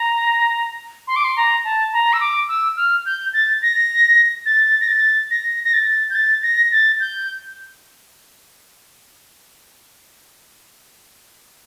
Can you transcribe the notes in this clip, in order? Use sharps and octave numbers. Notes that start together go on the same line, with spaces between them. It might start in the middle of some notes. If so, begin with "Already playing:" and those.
Already playing: A#5
C6
D6
C6
A#5
A5
A#5
E6
D6
E6
F6
G6
A6
A#6
A6
A#6
A6
A#6
A#6
A6
G6
A6
A#6
A6
G6